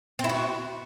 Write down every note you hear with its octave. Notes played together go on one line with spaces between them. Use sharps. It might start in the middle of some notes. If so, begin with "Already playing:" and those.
C4
E4
F#4